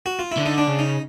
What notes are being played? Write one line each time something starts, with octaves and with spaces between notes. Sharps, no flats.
F#4
F4
E4
D3
D#4
D4
C#3
D#4